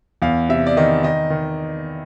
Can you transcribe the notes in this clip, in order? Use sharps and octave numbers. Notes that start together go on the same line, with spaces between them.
E2 F5
C3 E5
D5
D#3 D#5
D#3 D#5
D#3